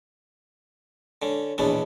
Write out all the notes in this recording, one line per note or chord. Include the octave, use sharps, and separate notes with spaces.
D3 C#4
A#1 E2 B2 B3 C#4 D4